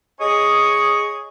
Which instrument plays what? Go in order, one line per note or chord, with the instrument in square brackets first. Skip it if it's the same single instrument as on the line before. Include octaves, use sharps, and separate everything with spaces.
[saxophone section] G#4 C#5 D#5